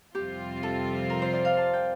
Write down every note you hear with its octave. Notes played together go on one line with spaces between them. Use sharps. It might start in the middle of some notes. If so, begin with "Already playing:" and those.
F2 C3 G3 C4 F4 G4
A4
A#4
C5
D5
F5
A5
G5